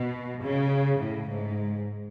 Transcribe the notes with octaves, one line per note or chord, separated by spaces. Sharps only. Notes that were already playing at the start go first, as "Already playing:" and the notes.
Already playing: B2
C#3
A2
G#2